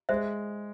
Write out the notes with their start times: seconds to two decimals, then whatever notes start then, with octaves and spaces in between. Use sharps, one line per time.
0.09 G#3 C5 E5